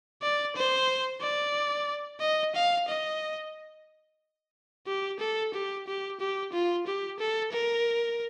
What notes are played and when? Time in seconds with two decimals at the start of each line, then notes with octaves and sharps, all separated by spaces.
0.22 D5
0.56 C5
1.21 D5
2.21 D#5
2.55 F5
2.88 D#5
4.87 G4
5.19 A4
5.54 G4
5.87 G4
6.20 G4
6.52 F4
6.86 G4
7.19 A4
7.52 A#4